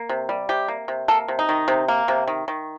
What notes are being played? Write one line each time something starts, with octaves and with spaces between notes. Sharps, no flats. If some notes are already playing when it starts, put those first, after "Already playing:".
Already playing: A#3
C3
G3
C3 G4
A#3
C3
A#3 A4
C3
D#4
D#3
C3
A#3
C3
D#3
D#3